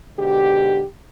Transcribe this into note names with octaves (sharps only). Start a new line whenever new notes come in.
G#2 B2 D3 G4